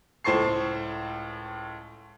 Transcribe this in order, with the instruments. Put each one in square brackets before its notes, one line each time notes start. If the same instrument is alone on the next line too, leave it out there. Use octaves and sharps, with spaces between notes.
[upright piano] C#2 A2 C5 A5 C#6 C7